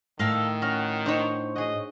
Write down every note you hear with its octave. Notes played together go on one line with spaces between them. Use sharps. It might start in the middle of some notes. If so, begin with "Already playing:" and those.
A2 D#3 A4 A#4 F5
C#4 F#4 F6
D4 D#4 C5 C#5 F#5
F#4 G#4 D#5